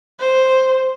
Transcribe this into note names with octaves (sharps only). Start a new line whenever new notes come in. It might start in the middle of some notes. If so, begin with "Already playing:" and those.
C5